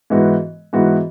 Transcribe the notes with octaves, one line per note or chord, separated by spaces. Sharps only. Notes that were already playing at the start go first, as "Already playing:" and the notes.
G#2 E3 B3 F#4
G#2 E3 B3 F#4